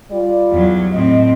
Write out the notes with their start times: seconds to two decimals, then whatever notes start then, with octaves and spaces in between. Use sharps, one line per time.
0.11 G3 F4 D5
0.53 E2 F#3
0.93 A2 C4 D#5